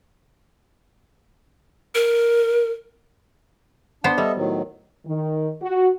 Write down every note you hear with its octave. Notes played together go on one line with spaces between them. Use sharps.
A#4
B3 D4 C5 G5
G3 A4 D#5 E5
A2 D#3 F#3
D#3
F#4